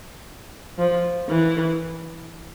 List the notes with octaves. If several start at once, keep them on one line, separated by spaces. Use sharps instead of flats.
F3
E3